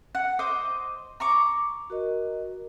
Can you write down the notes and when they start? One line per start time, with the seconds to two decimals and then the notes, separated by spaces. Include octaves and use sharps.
0.15 F#5
0.39 C5 D#5 D6
1.20 A#5 C#6 D6
1.90 F#4 A#4 D#5